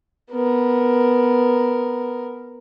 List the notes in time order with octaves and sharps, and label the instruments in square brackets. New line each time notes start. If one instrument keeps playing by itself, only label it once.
[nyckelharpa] B3 A#4